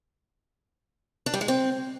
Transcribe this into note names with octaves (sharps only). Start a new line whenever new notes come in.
D4
G3
G#3
C4